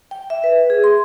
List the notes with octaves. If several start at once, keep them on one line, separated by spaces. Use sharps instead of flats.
G5
E5
B4
G#4
C6